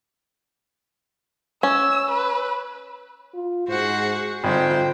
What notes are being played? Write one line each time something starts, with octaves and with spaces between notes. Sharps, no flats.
C#4 E6
B4
F4
G#2 F#4 G#4 C5 F#5
G#1 D3 G3 F4 C5 G5